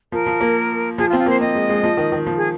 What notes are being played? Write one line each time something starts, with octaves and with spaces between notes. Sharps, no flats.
F3 A#4
F3
A#3
F3 G#4
F4
C4
F4
A#3 C5
C4 D#5
G#3
G#3
F3
D#3
D#3
F3
G#4